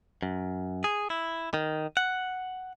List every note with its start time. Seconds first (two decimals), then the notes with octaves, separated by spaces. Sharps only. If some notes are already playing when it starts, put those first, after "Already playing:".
0.23 F#2
0.84 G#4
1.10 E4
1.54 D#3
1.97 F#5